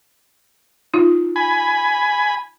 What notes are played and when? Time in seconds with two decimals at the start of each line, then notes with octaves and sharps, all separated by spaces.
0.94 D#4 F4
1.36 G#5 B5